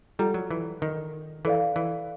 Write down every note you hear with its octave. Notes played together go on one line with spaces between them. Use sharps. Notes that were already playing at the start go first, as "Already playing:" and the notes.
G3 F4 A4 D5 F#5 A#5
F#3
E3
D#3
E3 A4 D5 F5
E3